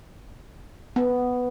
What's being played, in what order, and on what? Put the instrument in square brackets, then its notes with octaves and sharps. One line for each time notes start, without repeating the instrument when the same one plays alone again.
[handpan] B3